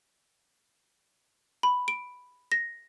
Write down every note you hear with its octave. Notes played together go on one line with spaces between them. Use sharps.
B5
D7
A#6